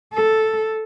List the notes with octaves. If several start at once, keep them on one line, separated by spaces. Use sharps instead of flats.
A4